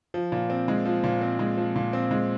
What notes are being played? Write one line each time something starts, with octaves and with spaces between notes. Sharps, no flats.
F3
A#2
C4
G#3
F3
A#2
C4
G#3
F3
A#2
C4
G#3